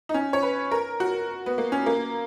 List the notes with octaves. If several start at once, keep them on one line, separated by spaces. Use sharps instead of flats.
D#4
C#4
C#5
B4
A#4
F#4
B3
A#3
C#4
A#3